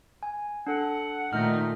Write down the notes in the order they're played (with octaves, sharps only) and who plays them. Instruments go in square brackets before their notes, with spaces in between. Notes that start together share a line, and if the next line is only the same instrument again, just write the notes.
[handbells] G#5
[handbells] D4 A4 [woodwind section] F#5
[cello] A#2 A3 [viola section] D#3 D#4 [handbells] F6 G6